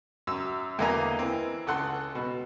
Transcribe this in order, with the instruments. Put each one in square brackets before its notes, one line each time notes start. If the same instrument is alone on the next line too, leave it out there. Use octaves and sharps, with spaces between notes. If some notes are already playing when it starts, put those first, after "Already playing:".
[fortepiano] F#2 E6
E2 D3 A#3 D#5 G#5 A#5
E3 C4
C#2 A4 F#5 C6
B2